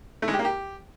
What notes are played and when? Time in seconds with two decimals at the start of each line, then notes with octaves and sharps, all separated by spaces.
0.22 A3
0.28 G#3
0.33 G4
0.39 A#3
0.44 G4